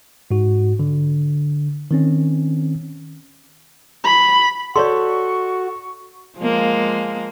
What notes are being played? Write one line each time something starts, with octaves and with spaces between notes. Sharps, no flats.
G#2 F#4
D3
D#3 C4 C#4
B5
F#4 A4 C#5 D5 C6 C#6
F3 G#3 A#3